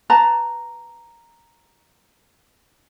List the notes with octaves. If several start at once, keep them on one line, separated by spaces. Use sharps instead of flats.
B4 A5 A#5